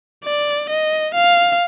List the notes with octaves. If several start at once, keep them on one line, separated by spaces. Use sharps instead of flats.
D5
D#5
F5